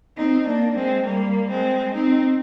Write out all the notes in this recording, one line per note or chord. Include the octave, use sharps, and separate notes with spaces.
C4 D#4
A#3 D4
G#3 C4
G3 A#3
G#3 C4
C4 D#4